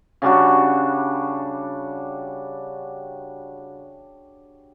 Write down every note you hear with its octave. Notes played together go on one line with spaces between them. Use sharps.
C#3 G3 D4 F#4